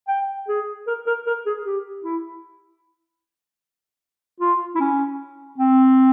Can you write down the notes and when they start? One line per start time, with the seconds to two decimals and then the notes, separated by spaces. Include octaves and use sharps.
0.08 G5
0.48 G#4
0.87 A#4
1.07 A#4
1.27 A#4
1.46 G#4
1.66 G4
2.04 E4
4.40 F4
4.75 E4
4.80 C#4
5.58 C4